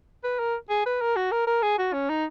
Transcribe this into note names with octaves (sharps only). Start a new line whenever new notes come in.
B4
A#4
G#4
B4
A#4
F#4
A#4
A#4
G#4
F#4
C#4
D#4